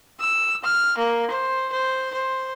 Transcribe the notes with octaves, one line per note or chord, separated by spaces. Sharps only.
E6
F6
A#3
C5
C5
C5